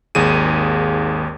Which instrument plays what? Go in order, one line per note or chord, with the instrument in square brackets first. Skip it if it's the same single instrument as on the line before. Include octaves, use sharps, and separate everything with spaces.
[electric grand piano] G#1 D#2 G#4 D#7